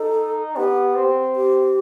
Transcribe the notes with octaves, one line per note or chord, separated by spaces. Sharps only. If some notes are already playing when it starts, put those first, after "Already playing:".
Already playing: D#4 A4
B3 G4
C4
G4